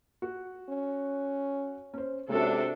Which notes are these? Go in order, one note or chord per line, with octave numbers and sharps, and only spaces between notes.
F#4
C#4
C#4 C5
C3 G#3 C#4 D4 F#4 A4 E5